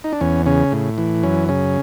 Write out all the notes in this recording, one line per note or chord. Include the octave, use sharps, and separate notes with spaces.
D#4
D4
E2 C#4
C#3 C#4
A2
E3
F#2 C#4
C#3 C#4